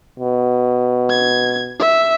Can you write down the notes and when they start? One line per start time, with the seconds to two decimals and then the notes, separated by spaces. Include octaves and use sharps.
0.20 B2
1.10 G#6
1.79 E5